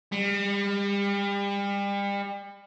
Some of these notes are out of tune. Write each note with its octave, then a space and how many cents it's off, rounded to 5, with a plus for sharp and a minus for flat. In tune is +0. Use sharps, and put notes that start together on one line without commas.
G3 +35